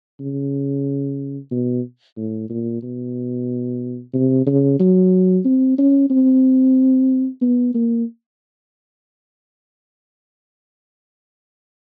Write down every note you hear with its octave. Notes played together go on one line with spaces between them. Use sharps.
C#3
B2
A2
A#2
B2
C3
C#3
F#3
C4
C#4
C4
B3
A#3